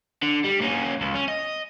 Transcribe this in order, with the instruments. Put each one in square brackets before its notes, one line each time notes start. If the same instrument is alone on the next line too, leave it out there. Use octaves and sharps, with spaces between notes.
[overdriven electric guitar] D3
G3
A#3 C#4
C#2
C#4
D#5